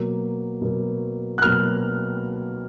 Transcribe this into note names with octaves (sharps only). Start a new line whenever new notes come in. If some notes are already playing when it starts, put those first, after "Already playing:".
Already playing: B2 F#3 A#3
B2 F#3 A#3
F#6
B2 F#3 A#3 F6